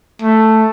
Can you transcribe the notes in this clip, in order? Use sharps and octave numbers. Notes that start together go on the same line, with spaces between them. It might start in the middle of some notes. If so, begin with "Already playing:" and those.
A3